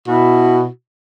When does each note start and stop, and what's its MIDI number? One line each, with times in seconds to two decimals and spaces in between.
0.07 0.67 47
0.07 0.67 64
0.07 0.67 66